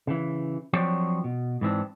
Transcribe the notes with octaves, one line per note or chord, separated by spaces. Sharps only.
C#3 E3
F3 F#3 C4 D4 C#5 G5
B2
G#2 E3 C4 D4